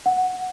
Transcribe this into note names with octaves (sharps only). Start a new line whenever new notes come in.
F#5